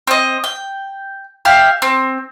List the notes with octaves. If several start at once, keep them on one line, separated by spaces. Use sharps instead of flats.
C4 D#5
G5
G4 E5 F5
C4